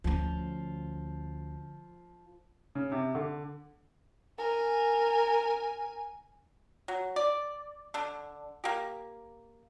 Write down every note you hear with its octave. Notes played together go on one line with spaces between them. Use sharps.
D2 F3 C#4
C#3
C3
D3
A#4 G#5
F#3
D5
D3 D4
A#3 G4